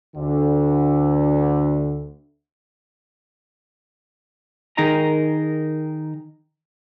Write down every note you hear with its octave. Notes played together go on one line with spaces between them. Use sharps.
D2 D3
D#3 D#4 G#4 A#4 D#5 A#5